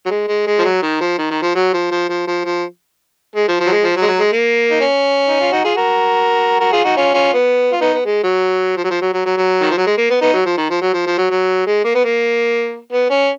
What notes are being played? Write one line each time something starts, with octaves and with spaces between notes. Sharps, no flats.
F#3
G#3
G#3
G#3
F3
F#3
D#3
F3
D#3
D#3
F3
F#3
F3
F3
F3
F3
F3
G#3
F3
F3
F#3
G#3
F3
F#3
G#3
F#3
G#3
A#3
D#4
C#4
D#4
F4
D#4 F#4
F4 G#4
F#4 A#4
F#4 A#4
F4 G#4
D#4 F#4
C#4 F4
C#4 F4
B3
F4
B3 D#4
B3
G#3
F#3
F3
F#3
F3
F#3
F#3
F#3
F#3
D#3
F3
F#3
G#3
A#3
B3
B3 D#4
F#3
F3
D#3
F3
F#3
F3
F3
F#3
F#3
G#3
A#3
B3
A#3
B3
C#4